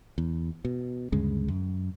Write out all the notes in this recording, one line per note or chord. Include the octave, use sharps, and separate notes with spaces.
E2
B2
D2 G2 C#3 G#3
F#2